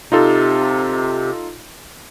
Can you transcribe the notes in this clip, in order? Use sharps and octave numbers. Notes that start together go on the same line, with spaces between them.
C3 D#4 F4 A4